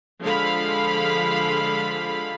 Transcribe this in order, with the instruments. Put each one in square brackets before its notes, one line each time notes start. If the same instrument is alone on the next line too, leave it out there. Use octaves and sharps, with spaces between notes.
[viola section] D3 F3 G#3 F5 B5